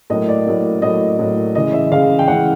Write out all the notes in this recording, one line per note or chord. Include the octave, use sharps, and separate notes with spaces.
A2 F#3 A#3 D#5
D5
A2 F#3 A#3
A2 F#3 A#3 D#5
A2 F#3 A#3
C#3 E3 G#3 D#5
E5
C#3 E3 G#3 F5
G5
C#3 E3 G#3 F#5